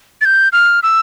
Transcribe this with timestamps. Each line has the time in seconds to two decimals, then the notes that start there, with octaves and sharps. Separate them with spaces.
0.21 A6
0.25 G6
0.52 F6
0.83 E6